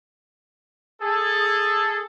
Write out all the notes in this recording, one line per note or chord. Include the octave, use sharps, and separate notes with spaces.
G#4 A4